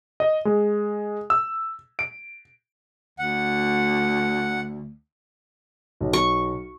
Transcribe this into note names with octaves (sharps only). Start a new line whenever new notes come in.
D#5
G#3
E6
D7
D2 F#5
B1
C#6